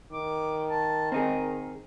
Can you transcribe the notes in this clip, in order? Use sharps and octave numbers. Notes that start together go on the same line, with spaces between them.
D#3 D6
A5
C4 D#4 G#4 A#4